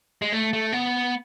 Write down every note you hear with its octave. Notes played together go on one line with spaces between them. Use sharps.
G#3
A3
A3
B3